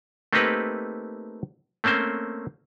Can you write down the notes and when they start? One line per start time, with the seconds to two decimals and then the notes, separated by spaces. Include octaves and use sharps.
0.33 A3 A#3 C4 D#4 G4 B4
1.84 A3 A#3 C4 C#4 C5